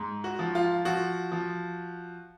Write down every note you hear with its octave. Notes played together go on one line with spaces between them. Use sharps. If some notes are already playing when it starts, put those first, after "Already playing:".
Already playing: G#2
F#4
F3
F4
F3 F#4
F3